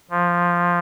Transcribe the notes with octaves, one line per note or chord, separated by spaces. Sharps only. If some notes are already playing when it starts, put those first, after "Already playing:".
F3